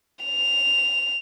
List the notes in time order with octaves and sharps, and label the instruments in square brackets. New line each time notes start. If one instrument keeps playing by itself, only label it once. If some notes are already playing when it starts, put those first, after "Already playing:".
[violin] F7